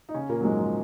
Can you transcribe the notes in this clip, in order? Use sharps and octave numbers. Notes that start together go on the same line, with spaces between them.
D#4
C#3 C#4
A#2 A#3
F#3
G#2 G#3
F3